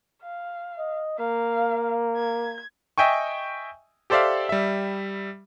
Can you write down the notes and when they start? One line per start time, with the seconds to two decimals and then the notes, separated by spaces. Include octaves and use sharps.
0.22 F5
0.78 D#5
1.19 A#3 F5
2.16 G#6
2.98 D#5 E5 G5 G#5 C#6
4.10 G4 A4 C5 D5 E5 F5
4.49 G3 E5